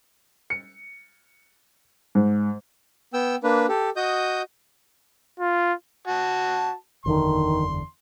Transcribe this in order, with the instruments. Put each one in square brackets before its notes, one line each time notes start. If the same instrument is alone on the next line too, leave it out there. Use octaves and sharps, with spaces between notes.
[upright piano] C#7
G#2
[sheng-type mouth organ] B3 G5 E6
A#3 D4 B4
G4 A4
F#4 D#5 D#6 G6
[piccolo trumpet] F4
[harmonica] F#4 A5
[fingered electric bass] F#1 E2 D3 [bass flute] D#3 [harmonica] C6